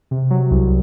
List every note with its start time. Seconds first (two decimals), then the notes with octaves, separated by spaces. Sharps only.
0.11 C3
0.31 F#3
0.51 C2